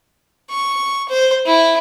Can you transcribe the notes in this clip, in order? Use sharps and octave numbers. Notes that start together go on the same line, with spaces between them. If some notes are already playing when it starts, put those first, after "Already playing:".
C#6
C5
E4